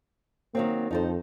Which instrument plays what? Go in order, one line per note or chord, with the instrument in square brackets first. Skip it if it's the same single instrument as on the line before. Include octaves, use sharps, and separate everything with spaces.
[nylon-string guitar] D#3 F#3 C4 [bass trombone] A#3
[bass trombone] F2 [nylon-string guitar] D#4 A4 C5